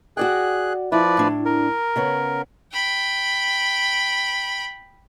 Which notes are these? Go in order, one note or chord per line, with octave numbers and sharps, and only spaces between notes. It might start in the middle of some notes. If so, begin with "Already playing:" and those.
F#4 G#4 D5 G5 F#6
F3 E4 B4 D5
A2 D4
A#4
C#3 B3 C#5
G5 B5